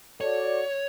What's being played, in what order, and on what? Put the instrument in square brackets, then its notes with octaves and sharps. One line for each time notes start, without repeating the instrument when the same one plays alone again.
[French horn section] F#4 A4 D5 [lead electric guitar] C#5